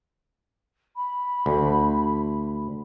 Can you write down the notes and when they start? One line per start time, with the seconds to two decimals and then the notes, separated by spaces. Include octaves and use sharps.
0.96 B5
1.46 D2